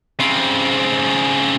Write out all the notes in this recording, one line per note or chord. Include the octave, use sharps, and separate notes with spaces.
C#3 C4